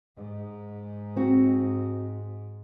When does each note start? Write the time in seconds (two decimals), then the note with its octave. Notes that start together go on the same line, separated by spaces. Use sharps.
0.15 G#2
1.16 C4 F#4